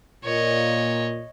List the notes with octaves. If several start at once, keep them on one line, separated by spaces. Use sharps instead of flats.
A#2 C#5 D#5